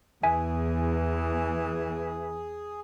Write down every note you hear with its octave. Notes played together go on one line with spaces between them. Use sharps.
E2 E3 G#4 E5 G#5 B6